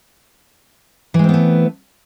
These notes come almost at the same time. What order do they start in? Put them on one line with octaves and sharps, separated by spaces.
E3 G#3 C4 B3 A3